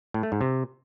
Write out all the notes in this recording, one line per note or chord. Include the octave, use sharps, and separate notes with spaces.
A2
A3
G#2
C3